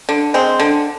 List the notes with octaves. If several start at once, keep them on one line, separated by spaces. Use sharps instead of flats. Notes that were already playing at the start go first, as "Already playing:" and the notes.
D3
G#3 C4
D3